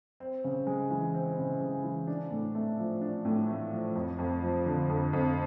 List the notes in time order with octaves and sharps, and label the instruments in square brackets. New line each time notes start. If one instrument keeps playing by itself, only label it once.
[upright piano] C4
C#3
G#3
E3
C4
C#3
G#3
E3
D4
A2
A3
F3
D4
A2
A3
F3
F2
F2
F3
D3
F2
F2